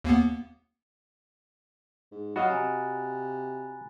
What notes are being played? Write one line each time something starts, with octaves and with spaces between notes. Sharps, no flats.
D#2 A#3 B3
G#2
F#3 F#4 D#5 F5 B5 F#6 A6
C3 G#5 A#5